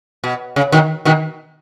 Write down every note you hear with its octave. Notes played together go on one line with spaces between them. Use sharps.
B2
C#3
B2 D#3
B2 D#3